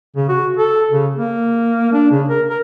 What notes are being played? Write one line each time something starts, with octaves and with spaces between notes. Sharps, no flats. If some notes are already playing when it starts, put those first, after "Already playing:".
C#3
F#4
A4
C#3
A#3
D4
C#3
A#4
A#4